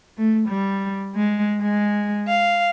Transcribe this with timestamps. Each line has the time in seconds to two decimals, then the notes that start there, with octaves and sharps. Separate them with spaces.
0.17 A3
0.47 G3
1.14 G#3
1.61 G#3
2.28 F5